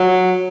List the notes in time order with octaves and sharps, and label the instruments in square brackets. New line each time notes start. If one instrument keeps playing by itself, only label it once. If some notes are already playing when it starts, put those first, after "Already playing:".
Already playing: [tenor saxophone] F#3